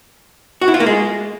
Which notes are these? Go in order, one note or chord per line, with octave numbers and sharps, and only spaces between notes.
F#4
E4
F4
A#3
G#3